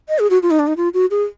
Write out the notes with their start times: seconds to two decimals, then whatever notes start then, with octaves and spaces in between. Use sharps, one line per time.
0.09 D#5
0.19 G#4
0.30 F#4
0.43 F4
0.51 D#4
0.59 D4
0.67 D#4
0.77 F4
0.94 F#4
1.11 G#4